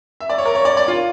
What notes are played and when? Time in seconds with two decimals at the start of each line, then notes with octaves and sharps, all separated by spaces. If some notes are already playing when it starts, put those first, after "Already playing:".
0.20 E5
0.29 D5
0.38 C#5
0.46 A#4
0.55 C#5
0.65 D5
0.77 D5
0.88 F4